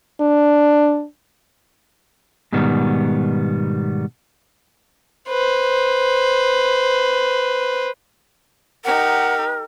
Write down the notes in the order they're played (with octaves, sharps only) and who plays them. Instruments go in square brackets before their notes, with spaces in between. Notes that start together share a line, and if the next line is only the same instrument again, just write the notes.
[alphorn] D4
[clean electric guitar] G#2 B2 D#3 G3 B3
[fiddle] B4 C5
[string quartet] D#4 G4 [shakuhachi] A#4 [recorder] F#5